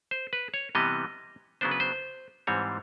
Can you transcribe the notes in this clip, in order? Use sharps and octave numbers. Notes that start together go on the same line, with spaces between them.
C5
B4
C#5
C3 E3 G3 B3 D#5
C#3 F#3 B3 D4 C5
B4
C5
G#2 E3 G3 C4 C#5